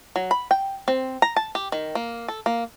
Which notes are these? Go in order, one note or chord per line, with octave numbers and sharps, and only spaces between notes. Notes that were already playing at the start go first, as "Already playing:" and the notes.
F#3
B5
G5
C4
A#5
A5
G4
D#3
A#3
A4
A#3